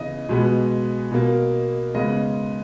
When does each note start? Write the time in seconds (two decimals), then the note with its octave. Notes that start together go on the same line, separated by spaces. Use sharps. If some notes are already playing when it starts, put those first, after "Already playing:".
Already playing: C#3 E3 B3 D#5
0.29 B2 G#3 B3
1.12 B2 A#3
1.94 C#3 G#3 B3 D#5